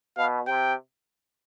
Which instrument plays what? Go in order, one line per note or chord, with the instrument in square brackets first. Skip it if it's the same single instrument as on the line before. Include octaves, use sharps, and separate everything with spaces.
[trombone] B2 [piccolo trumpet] F5
[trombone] C3 [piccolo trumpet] G5